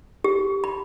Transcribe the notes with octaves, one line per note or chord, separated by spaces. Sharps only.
G4
B5